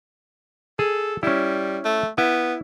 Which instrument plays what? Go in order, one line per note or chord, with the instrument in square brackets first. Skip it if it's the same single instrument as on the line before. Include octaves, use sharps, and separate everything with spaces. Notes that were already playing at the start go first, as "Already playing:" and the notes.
[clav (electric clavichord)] G#4 [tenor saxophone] A4
[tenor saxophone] G3 [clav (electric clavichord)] C#4 E4
[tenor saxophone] A3
[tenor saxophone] B3 [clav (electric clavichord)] E4